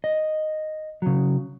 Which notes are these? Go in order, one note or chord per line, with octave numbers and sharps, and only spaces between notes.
D#5
C#3 F#3